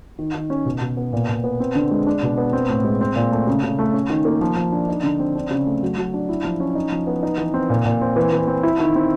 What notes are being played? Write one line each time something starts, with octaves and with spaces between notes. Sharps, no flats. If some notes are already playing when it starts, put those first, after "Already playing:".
D#3
D#3
C#4
B2
B2
B3
A#2
A#2
B3
C4
D3
G#3
D4
B2
B3
C4
A2
G#3
C4
A#2
A3
C#3
C#3
A3
C#4
D#3
A#3
F3
F3
D4
D#4
D3
C4
D4
C#3
A3
F#3
F#3
D4
E4
F3
C#4
D#4
F3
B3
D#4
E3
C4
A#2
A#2
C4
E3
E3
C4
E4
D#3
C4